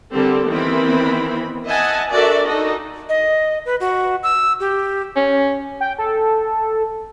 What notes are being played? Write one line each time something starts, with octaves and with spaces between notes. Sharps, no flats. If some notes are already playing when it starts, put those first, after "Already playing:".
D3 G3 C4 G4 A4 A#4
D#3 E3 B3 C4 A#4 B5
D#5 E5 F#5 G#5 A5
D4 F#4 A4 A#4 D5 E5
D#4 F#4 A4 D#5
D#5
B4
F#4
E6
G4
C#4
G5
A4